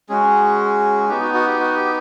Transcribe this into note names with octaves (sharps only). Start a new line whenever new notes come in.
G#3 C#4 F#4 G#4
B3 D#4 F#4 G4
F#4
F#4
G4
F#4
G4